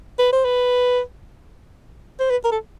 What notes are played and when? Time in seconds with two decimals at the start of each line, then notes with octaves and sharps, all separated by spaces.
0.19 B4
0.33 C5
0.45 B4
2.20 C5
2.30 B4
2.45 A#4
2.51 A4